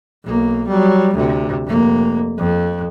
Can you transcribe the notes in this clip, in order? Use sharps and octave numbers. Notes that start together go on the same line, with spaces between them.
B1 A#3
F#3 G3
D2 C3
F1 A#3
F2